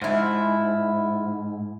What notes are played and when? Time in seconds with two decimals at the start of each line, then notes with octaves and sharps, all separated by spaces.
0.02 G#2 F3 E4